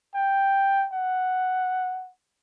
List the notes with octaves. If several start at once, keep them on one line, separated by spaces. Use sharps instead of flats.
G5
F#5